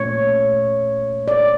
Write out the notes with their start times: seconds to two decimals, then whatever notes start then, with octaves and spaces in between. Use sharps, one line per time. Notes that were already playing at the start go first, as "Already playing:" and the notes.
Already playing: A#2 A3 C#4 C#5
1.28 D5